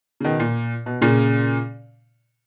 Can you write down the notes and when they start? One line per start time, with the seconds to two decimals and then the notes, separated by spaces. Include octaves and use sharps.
0.20 C#3
0.24 B2 D#3
0.39 A#2
0.86 B2
1.01 A#2 C#3